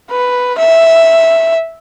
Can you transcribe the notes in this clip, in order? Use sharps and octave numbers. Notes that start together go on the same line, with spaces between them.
B4
E5